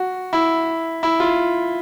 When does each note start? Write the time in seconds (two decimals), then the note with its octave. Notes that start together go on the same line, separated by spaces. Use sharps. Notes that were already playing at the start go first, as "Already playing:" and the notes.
Already playing: F#4
0.33 E4
1.03 E4
1.20 F4